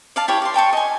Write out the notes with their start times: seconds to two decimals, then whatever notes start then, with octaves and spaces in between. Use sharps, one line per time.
0.16 D5 F5 A5
0.28 E4 G4 C#5
0.42 D5 C6
0.54 D5 G5 A5 C#6
0.73 D#5 G#5